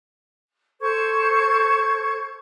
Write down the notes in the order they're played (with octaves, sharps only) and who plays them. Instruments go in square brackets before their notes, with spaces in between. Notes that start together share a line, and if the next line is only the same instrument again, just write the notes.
[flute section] A4 C5 C#6 G#6